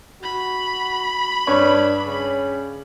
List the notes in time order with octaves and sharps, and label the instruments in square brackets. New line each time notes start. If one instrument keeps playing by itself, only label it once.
[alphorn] F#4 [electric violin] B5
[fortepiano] G2 C#5 [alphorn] D4
[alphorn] C#3